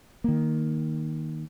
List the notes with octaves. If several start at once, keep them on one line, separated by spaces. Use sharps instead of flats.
D#3 A#3